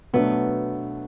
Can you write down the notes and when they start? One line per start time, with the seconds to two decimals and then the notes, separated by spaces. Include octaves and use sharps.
0.13 B2 F#3 A3 B3 D4